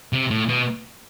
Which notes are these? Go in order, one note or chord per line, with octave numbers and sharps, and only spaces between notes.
C3
A2
B2